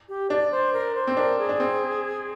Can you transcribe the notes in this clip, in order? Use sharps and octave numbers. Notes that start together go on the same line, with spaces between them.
G4
D4 D5
C5
A#4
C5
C4
D4 A#4
G#4
D4
C4